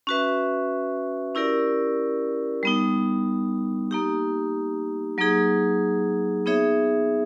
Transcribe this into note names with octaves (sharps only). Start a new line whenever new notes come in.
C#4 F#4 B4 E5
C#4 E4 G4 A#4 D5
G3 B3 D#4
A#3 D#4 G4
F#3 A#3 D#4 G#4
B3 D#4 G#4 C#5 E5